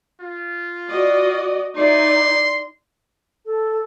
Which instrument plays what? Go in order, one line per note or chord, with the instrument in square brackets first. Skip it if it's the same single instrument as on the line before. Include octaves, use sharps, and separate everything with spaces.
[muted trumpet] F4
[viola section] F#4 D5 D#5
[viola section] D#4 E4 D5 [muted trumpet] C6
[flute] A4